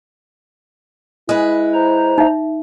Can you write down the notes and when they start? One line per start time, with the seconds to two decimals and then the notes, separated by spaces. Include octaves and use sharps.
1.29 G#3 E4 B4 D#6
1.74 C5 A#5
2.18 D#4 E5